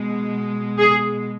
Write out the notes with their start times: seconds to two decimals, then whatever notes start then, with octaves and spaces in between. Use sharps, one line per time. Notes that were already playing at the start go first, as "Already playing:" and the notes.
Already playing: B2 G#3
0.79 G#4